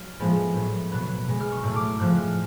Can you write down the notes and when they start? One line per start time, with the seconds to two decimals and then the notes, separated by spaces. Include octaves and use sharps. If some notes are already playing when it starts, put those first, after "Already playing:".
Already playing: F#3 F6
0.20 A2 F3 G#3 B3
0.55 A2 F#3 B3
0.91 B2 F#3 B3 F#6
1.27 B2 G#3 B3
1.40 F6
1.52 C#6
1.63 A2 F#3 A3 F6
1.76 D6
1.88 F6
2.00 A2 F3 G#3 F#6
2.18 F6